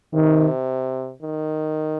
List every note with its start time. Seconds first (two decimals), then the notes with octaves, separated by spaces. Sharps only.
0.14 C3 D#3
1.22 D#3